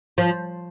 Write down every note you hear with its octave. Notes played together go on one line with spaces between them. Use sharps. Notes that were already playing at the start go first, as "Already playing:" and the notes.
F3